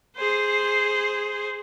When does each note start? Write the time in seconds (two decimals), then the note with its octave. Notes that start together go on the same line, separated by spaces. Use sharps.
0.17 G#4 C5